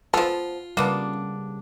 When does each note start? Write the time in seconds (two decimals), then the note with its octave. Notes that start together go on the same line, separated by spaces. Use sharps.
0.14 F3 B3 F4 A4
0.77 C#3 G3 A#3 B3 D4